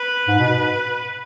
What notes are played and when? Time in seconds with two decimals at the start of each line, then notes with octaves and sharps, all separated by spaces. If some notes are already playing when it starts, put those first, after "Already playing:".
Already playing: B4
0.28 G#2
0.39 B2